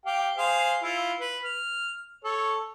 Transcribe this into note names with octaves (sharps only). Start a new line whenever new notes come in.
G4 F5 G5
G#4 C5 F5
E4 F4
B4
F6
A4 C#5